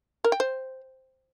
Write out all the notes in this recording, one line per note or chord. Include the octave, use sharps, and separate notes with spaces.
A#4
G5
C5